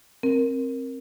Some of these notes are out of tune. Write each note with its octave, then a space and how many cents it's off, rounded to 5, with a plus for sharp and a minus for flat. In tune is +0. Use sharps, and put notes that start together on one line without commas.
C4 +20 A#4 +0